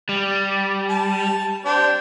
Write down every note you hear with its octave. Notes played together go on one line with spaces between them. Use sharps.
G3
A5
C4 D4 G4